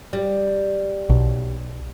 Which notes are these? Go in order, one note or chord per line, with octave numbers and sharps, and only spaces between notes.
G3
B1